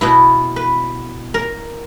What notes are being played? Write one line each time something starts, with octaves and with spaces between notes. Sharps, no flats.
B2 B3 E4
B4
A#4